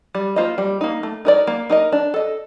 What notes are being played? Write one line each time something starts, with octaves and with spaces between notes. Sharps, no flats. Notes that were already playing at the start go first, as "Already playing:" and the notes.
G3
A#3 F4 C5 D#5
G3
A#3 D#4
A3
D#4 A#4 D5
A#3
D#4 A#4 D#5
D4
A4 D#5